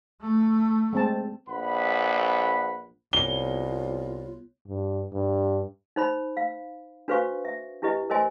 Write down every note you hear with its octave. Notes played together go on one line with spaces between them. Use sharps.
A3
G#3 C4 A5
A#1 B4 F#5 B5
C2 B3 F4 C#5 G7
G2
G2
D#4 C5 B5
F5
D4 F#4 B4 C5 F5 C#6
E5
D4 E4 G4 B4 D#5
A#4 C5 D#5 G#5 C6